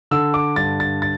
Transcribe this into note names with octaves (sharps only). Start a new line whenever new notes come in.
D3 E6
D6
G2 A6
A6
A6